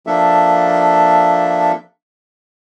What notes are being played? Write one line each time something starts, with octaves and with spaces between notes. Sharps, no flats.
F3 A#3 D4 A4 E5